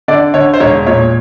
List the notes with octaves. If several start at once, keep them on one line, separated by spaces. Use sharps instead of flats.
D3 D5
D3 C#5
C5
E1 C#5
A#2 C#5